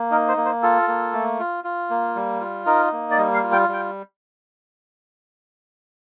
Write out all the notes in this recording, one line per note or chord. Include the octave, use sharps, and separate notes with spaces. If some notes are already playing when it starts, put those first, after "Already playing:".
Already playing: A#3
D#4 A#4
C5
A#3
C5
F4 A4
A#3
A3
F4
F4
A#3
G3
F4
D#4 A#4
A#3
D5
G3 D#5
F5
F4
G5
G3 G5